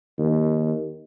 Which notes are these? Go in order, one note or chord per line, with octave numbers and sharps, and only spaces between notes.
D#2